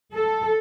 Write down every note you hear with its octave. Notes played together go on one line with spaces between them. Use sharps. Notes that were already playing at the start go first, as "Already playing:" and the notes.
A4